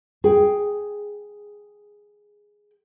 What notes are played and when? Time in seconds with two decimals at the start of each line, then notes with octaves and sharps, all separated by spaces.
0.24 G#4 G5